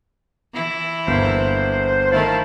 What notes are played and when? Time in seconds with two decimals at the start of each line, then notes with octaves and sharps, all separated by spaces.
0.53 E3 E4
1.07 G1 A#3 C5
2.11 D#3 A3 E4 C5 F5 A5